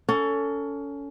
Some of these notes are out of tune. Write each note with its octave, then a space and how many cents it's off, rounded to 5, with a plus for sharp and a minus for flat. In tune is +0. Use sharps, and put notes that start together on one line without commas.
C#4 +25 A4 +20